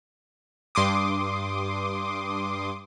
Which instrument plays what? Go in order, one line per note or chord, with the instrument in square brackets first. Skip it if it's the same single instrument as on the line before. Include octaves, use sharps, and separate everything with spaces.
[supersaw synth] G2 C6 D6 D#6